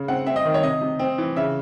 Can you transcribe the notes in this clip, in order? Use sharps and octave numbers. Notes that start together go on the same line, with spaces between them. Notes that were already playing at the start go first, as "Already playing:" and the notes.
Already playing: C#3
C4 F#5
C4 E5
D#5
D#3
C#5
C3 D#5
C3
C4
E3
C#3 E5